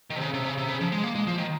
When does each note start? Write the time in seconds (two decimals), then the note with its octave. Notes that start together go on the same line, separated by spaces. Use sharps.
0.10 D#3
0.16 C3
0.21 C#3
0.34 C3
0.45 C#3
0.57 C3
0.68 C#3
0.80 F3
0.92 G#3
1.03 A#3
1.15 G#3
1.27 F3
1.38 D#3